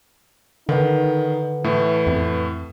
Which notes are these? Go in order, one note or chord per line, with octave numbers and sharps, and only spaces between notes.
D3 D#3 D#4 A4 B4 F#5
A2 E3 A3
F2